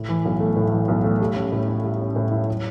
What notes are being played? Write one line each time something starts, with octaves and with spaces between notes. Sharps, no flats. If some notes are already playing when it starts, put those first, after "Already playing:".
Already playing: A2
E3
B1
A3
A2
E3
B1
A3
G3
C#4
A2
E4
G3
C#4
A2
E4
F#3